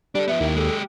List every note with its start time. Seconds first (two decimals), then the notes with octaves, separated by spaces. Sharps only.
0.15 G3 D4 A4 D5
0.28 F3 B3 E5
0.40 D#2 E4 G4
0.56 G#3 G4 A4